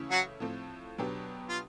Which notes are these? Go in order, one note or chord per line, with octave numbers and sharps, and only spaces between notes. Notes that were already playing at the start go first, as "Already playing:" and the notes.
Already playing: C#3 E3 A3 C#4 E4
F#3 F#4
A2 F3 A3 C4
B2 F#3 B3 D4 G4
F4